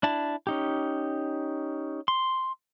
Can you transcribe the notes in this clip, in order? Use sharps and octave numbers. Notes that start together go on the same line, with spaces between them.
D4 E4 A5
C#4 D#4 G4
C6